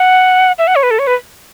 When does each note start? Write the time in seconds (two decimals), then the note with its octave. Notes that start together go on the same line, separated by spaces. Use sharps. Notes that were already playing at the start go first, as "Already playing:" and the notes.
Already playing: F#5
0.58 E5
0.67 F#5
0.76 C#5
0.83 B4
0.91 A4
0.99 C#5
1.07 B4